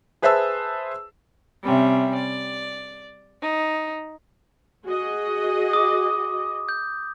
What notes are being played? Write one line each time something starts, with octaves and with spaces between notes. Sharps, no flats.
G#4 B4 C5 E5 A5 E6
C3 G3 C#4 E5
D5
D#4
F#4 G#4 D#5
D6 D#6
G6